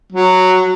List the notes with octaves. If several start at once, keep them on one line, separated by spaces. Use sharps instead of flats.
F#3